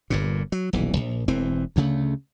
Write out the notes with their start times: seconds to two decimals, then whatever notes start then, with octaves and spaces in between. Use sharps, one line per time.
0.10 G1 G2 A#2
0.52 F#3
0.73 D#1 B1 E3
0.97 A#1
1.28 E1 E3 C4
1.76 D2 C#3 A3